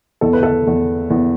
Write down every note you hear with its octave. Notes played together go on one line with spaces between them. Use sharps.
E2 A4
B4
A4
E2
E2